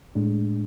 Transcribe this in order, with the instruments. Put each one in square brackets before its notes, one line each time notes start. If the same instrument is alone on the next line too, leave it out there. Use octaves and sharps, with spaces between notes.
[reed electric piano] A2 G#3 D4